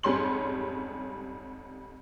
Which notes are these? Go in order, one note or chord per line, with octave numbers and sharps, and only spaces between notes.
F2 G#2 G3 C#4 C6 F#7